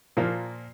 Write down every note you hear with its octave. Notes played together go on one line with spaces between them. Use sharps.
A#2 F3 A#3